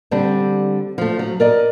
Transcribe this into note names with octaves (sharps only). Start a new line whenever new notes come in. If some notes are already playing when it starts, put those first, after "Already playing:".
D3 G3 C4 D4
F3 A3
F#3
A#4 D5 D#5